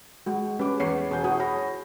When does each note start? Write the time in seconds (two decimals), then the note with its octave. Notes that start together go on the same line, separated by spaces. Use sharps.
0.26 G#3 F#4
0.59 G3 C#4 B4 D6
0.80 E2 B4 C#5 C7
1.11 E1 G#4 F#5 G6
1.24 E4 F#4 D#6
1.40 C#5 B5 A#6